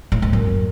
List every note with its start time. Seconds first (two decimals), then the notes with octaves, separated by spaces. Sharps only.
0.12 A2
0.22 G#2
0.33 F#2